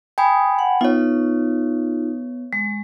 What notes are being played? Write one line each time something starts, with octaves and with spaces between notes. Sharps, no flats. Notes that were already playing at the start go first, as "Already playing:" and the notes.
G5 G#5 B5 D#6
F#5
B3 D#4 F4 C#5
G#3